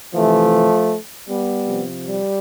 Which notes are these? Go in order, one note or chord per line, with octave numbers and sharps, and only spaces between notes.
C3 E3 F3 A3
G3 B3
C3 F3
G3